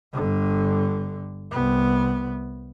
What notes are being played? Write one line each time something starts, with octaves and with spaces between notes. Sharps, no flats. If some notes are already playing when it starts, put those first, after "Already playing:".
G1 D3
C2 B3